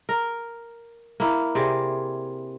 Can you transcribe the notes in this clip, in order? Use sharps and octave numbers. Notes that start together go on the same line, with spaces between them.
A#4
A#3 E4
C3 G#4 D5